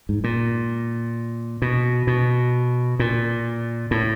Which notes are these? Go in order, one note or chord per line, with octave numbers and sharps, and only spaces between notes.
G#2
A#2
B2
B2
A#2
A2